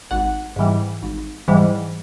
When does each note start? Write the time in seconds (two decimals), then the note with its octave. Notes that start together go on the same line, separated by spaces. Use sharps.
0.11 G#1 F#5
0.56 G#2 E3 G3
1.02 G#1
1.48 G#2 E3 G3